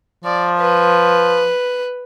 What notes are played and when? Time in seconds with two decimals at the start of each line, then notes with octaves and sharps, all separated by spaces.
0.24 F3 D5
0.58 B4